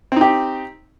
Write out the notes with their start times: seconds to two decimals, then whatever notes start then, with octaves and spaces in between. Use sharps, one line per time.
0.12 C4
0.16 D#4
0.21 G4